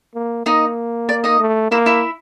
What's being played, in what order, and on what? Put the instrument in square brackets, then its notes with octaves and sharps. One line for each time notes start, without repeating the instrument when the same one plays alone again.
[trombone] A#3
[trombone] A#3 [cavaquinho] D#4 D#5
[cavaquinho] D5
D#4 D#5
[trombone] A3
[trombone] A#3 [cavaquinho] E4 E5
[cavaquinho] E4 E5